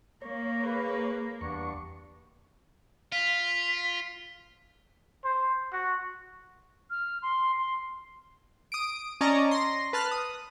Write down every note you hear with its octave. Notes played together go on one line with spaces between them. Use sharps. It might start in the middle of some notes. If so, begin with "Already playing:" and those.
A#3 C#5
G#4 A#4 B4
E2 G2 B3 D4 C#6
F4 B6
C5
F#4
F6
C6
C6
D#6 D7
C#4 D5 D#5 A5 A#5 C#6
C6 A#6
B4 A5 F6 F#6
D#6